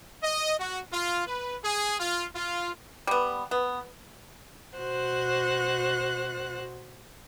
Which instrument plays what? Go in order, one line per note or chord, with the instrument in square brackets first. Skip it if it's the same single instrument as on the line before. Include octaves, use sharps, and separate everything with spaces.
[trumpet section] D#5
F#4
F4
B4
G#4
F4
F4
[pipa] G3 B3
B3
[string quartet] B2 F#4 C5 F#6